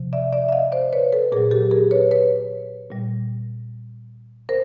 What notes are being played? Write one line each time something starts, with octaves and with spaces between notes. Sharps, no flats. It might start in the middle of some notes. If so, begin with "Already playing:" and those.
Already playing: C3 F3
D5 E5
D5 E5
E5
D#5 F5
C5 D5
B4 C#5
A4 B4
A#2 F#3 G#4 A#4
G4 A4
G#4 A#4
B4 C#5
B4 C#5
A#2 G3
A#4 C5